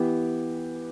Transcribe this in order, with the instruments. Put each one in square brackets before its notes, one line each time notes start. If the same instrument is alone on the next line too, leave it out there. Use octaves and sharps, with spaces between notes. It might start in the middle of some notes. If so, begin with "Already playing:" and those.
Already playing: [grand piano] E3 B3 G4